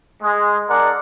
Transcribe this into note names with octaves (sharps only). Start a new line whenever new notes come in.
G#3
G#3 D4 A#4 D5 F#5